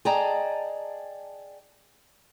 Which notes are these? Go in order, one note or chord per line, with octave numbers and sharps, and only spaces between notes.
G#4 D5 D#5 G5 A5 A#5